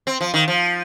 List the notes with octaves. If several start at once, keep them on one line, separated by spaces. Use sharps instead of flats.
C4
F3
D#3
F3